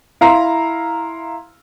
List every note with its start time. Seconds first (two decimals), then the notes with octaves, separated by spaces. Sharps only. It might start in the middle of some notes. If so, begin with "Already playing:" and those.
0.21 E4 F5 A#5 C6